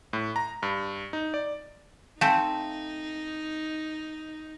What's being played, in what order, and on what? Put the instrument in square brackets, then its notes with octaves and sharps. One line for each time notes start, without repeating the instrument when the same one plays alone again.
[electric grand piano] A2
A#5
G2
D#4
D5
[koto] A3 C4 [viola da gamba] D#4 [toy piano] F5 G#5 A5